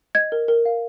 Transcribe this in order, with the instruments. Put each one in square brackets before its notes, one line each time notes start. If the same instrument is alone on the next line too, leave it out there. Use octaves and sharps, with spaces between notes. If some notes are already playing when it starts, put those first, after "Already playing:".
[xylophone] D#5 G#6
A#4
A#4
F5